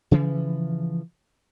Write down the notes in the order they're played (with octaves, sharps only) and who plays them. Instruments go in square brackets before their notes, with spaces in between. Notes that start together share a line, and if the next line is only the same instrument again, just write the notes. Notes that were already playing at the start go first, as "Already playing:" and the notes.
[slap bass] C#3 E3 F3